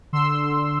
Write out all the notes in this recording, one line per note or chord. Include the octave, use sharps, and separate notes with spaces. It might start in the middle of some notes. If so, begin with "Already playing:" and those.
D3 C6 E6